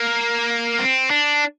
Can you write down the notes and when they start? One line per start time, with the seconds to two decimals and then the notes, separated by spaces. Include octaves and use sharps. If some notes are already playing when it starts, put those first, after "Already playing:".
Already playing: A#3
0.79 C4
1.10 D4